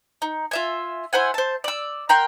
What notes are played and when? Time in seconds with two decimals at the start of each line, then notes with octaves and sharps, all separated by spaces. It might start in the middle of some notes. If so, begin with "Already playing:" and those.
0.22 D#4
0.51 F4 E5 G#5
1.13 E4 C5 F#5 G#5
1.34 C5 A5
1.64 D5 E6
2.09 A#4 F#5 G5 C6